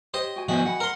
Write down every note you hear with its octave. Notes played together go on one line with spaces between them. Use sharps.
G4 C5 C#5 D#5 G5
F#4 G5 G#5
F3 B3 E4 F#4 C5 D#5 G#5
D#5 F#5 G5 B5
A#4 C6